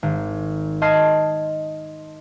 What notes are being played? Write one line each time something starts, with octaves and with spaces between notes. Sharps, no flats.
G#1
D#5 A5 C6 F6 G#6 C7